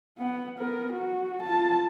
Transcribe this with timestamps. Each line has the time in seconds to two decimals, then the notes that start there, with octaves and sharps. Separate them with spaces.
0.18 B3 F#5
0.59 B3 A#4
0.93 F#4
1.43 F4 A5